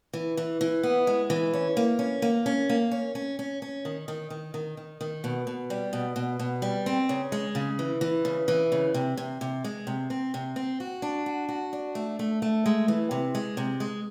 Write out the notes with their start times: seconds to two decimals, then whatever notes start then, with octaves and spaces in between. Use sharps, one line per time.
0.13 E3
0.37 E3
0.61 E3
0.83 B3
1.07 G#3
1.30 E3
1.53 C#4
1.77 A#3
1.99 C#4
2.22 A#3
2.46 C#4
2.69 A#3
2.91 C#4
3.15 C#4
3.39 C#4
3.62 C#4
3.85 D#3
4.08 D#3
4.30 D#3
4.54 D#3
4.77 D#3
5.01 D#3
5.24 B2
5.47 B2
5.70 G3
5.93 B2
6.16 B2
6.39 B2
6.62 G3
6.86 C4
7.09 C#3
7.32 G#3
7.55 C#3
7.79 E3
8.01 E3
8.25 C#3
8.48 E3
8.72 C#3
8.94 C3
9.17 C3
9.41 C3
9.64 G#3
9.87 C3
10.10 C4
10.34 C3
10.56 C4
10.80 F#4
11.02 D4
11.26 F#4
11.49 F#4
11.73 D4
11.95 A3
12.19 A3
12.42 A3
12.66 G#3
12.88 E3
13.11 C3
13.35 G#3
13.57 C3
13.80 G#3